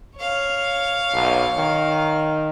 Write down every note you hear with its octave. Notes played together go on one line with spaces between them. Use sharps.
C#5 F5
B1
D#3